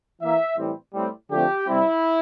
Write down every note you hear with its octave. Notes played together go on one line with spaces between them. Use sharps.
E3 A#3 E5
A2 E3 G3 C4
A2 G3 C4
D3 F3 A3 C4 G4
C3 G3 C4 E4